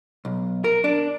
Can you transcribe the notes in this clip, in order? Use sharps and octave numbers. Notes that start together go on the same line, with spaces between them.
B1
A#4
D4